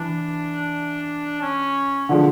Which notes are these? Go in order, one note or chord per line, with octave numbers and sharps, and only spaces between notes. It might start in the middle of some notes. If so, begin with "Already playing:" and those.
Already playing: E3 D4
C#4
D3 F3 G#3